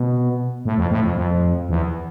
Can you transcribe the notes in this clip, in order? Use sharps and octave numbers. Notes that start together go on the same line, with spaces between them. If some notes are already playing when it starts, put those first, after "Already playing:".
Already playing: B2
A2
F2
A2
F2
F2
E2